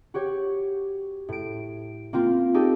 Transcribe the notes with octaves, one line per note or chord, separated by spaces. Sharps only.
F#4 G4 C#5
A2 D7
A#3 C4 F4
D#4 G4 A4